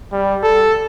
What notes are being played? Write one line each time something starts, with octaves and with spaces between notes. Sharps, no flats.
G3
A4